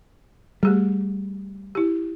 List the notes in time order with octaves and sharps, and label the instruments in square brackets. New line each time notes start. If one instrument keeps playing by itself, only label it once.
[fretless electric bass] G3 [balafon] A3 G4 G#4
[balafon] E4 G4